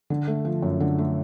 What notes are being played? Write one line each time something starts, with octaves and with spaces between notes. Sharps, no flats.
D3
A3
F3
F#2
D3
A3